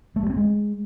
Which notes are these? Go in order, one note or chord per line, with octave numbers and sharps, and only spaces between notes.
A3
G3
C4
G#3